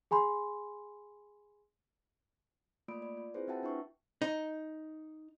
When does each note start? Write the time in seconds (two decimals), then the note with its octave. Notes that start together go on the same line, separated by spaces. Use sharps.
0.11 G#4 G#5 B5 C6
2.88 A3 A#3 F4 D5 B5 D7
3.02 D5
3.17 F4
3.34 C4 E4 F4 G#4 B4 C5
3.48 C4 F#4 E5 F#5 G5 A5
3.63 D4 E4 B4 E5 C#6
4.22 D#4